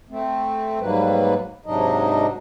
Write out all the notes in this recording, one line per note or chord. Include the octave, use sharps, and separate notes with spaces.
A3 C4
G#2 F#3 G3 A#3 B4
G#2 C3 F#3 D4 D#4 D#5